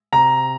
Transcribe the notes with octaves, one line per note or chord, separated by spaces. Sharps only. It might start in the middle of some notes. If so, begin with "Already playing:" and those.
C3 A#5